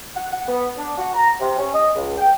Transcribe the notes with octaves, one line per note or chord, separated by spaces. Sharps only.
F#5
F#5
B3
D4
F#4
A#5
C3
C#4
D#5
C#2
G5